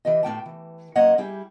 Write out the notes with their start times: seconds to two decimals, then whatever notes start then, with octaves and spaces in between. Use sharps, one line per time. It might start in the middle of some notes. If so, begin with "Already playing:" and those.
0.05 E3 G4 D#5
0.23 A2 C#4 G5 A5
0.46 E3
0.96 F#2 A#3 C#5 D#5 F#5
1.18 G3 E4 G4 G#4